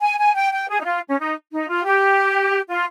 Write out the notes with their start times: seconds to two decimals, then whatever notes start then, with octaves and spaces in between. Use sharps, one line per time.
0.01 G#5
0.18 G#5
0.35 G5
0.52 G5
0.68 G#4
0.80 D#4
0.85 F4
1.08 C#4
1.19 D#4
1.52 D#4
1.68 F4
1.85 G4
2.69 F4